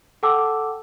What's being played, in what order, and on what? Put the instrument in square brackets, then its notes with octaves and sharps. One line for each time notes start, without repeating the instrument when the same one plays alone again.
[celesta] A4 F#5 G5 A5 D6 E6